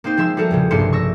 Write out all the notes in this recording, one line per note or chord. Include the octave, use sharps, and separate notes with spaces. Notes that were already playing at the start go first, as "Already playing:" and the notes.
A#3 C4 D#4 C5
F3 G#3 E5 C6 E6
G3 F#4 A4 A#4
E2 A#2 C#3
F1 A#1 G2 A#3 C6 C#7
C#6 E6 A#6